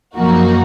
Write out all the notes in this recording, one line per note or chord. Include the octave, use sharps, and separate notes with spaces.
F#2 F3 A#3 D#4 F#4